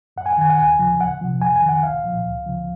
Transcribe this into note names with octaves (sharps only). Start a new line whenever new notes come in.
F#2 F#5
G#5
F#5
D#3 G#5
F#5
D#2 G#5
C#3 F3
C2 F#5
C3 F3
F2 G#5
G#5
D#3
F#5
C2 F5
A#2 F3
C#2
C#3 F3